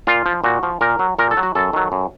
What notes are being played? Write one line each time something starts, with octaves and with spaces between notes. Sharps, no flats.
A#2 F4
F3
A#2 F#4
F3
A#2 A#4
F#3
A#2 A#4
A4
F#3
F#4
F#2 A4
D#3 F#3
F#2